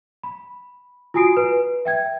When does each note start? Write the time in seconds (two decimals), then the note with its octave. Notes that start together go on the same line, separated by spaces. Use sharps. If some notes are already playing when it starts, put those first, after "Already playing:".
0.24 B5
1.14 F4 F#4 G#5 D#6 C7 D7
1.37 B4
1.85 E5 G5 G#6